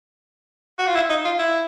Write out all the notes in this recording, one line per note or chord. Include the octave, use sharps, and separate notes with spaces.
F#4
F4
E4
D#4
F4
E4